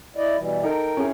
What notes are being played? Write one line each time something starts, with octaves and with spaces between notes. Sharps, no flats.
E4 D5 D#5
B2 E3 G3
D#4 A4 A#4 G5
C#4 E4 G#4